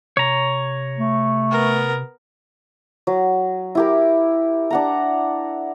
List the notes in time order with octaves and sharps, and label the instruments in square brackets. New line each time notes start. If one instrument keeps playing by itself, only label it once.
[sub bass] C3 [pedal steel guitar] C#5 A#5
[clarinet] A3
[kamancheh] B3 A#4
[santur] F#3
E4 G4 A#4
D4 F#5 A#5